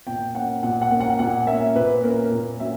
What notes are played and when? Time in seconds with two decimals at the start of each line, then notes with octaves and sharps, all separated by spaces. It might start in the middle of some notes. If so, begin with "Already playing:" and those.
0.07 A#2 G5
0.35 A#3 C#4 F#5
0.63 A#2 F#5
0.82 F#5
0.91 A#3 C#4
1.00 F#5
1.19 A#2 F#5
1.47 A#3 C#4 E5
1.75 A#2 B4
2.04 A#3 C#4 A#4
2.31 A#2
2.59 F#3 A#3 C#4 E5